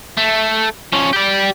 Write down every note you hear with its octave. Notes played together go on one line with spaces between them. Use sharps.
A3
F3 C#4
G4 D5